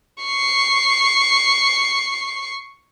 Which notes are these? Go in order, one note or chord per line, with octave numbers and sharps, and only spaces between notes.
C#6 C7